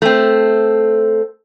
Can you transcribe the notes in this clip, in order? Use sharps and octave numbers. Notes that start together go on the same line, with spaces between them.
A3 C4